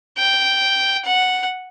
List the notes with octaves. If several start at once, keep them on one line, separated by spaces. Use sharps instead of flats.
G5
F#5